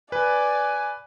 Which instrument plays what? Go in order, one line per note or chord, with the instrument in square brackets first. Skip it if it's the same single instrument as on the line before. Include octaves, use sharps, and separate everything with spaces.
[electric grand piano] B4 [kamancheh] D5 [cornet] G#5